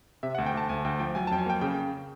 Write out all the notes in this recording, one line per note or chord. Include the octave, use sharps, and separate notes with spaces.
C3 E5
F#5
D2
G5
D2 A5
D2 G#5
D2 G5
F3 G5
F#3 G#5
A5
F2 G5
G#5
A#3 G5
C#3 G5